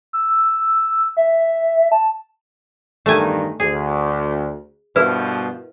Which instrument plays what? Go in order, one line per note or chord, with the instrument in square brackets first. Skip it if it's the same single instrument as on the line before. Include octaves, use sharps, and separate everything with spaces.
[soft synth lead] E6
E5
A5
[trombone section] E2 G2 D#3 [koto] A3 G#5
[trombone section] D2 [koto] G#4
[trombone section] G2 B2 F3 [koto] E4 [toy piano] A#4 B4